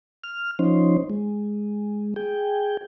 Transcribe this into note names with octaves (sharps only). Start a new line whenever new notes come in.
F6
F3 C#4 D#4 C5
G#3
G#4 G5